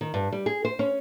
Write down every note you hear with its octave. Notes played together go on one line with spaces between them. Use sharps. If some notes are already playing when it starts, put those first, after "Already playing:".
D#3
G2
G3
G#4
C5
C#4